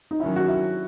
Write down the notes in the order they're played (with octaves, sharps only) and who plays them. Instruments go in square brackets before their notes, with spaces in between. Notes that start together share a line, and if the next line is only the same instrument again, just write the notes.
[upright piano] D#4
[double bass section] D#3 F#3 C#4 [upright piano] E4
[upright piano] F#4
E4